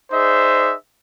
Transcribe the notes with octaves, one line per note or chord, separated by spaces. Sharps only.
D#4 G#4 C5 D5 E5